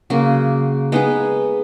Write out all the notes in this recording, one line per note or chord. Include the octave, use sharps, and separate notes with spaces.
C#3 F#3 A#3
G#3 B3 D#4 G#4